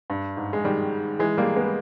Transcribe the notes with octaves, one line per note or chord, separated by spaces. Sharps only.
G2
G#2
G#3
D#3 G3
E3 G#3
G3 A#3
G#3 B3